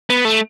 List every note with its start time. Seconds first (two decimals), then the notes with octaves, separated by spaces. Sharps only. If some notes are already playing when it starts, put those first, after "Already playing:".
0.10 B3
0.25 A3